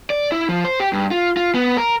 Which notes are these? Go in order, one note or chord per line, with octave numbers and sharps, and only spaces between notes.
D5
E4
F3
C5
G4
G2
F4
F4
B3
A#4